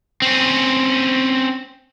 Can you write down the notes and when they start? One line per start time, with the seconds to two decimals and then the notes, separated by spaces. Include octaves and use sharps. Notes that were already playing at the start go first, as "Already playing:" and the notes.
0.22 C4 C#4